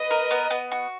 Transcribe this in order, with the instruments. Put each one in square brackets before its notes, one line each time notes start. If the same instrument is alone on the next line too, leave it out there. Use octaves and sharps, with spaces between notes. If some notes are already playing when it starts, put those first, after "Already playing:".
Already playing: [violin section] B4 D#5
[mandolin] A#4
B3
B3
F#4